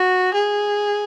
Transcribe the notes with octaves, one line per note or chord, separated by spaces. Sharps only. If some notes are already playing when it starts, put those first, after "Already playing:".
Already playing: F#4
G#4